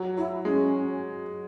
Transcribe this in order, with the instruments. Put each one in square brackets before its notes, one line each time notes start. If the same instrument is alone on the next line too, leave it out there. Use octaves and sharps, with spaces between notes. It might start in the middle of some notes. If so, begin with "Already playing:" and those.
Already playing: [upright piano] F#3
[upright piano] F#3 [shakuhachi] E4
[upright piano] G#3 [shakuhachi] C#4